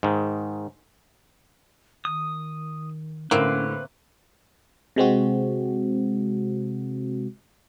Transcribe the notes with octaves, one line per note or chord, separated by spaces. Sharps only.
G#2 D#3
D#3 D#6
A2 D3 A#3 C4 C#4 B4
C3 G#3 C4 F#4